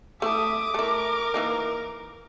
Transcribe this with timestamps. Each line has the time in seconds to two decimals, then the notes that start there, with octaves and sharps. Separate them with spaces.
0.22 A3 E4 A4 E5 D6 D#6
0.74 A3 E4 A#4
1.34 E3 A#3 D#4